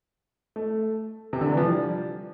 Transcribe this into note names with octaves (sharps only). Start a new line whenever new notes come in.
A3
C3
D3
E3
F3
G3